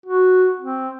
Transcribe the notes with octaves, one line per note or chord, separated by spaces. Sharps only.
F#4
C4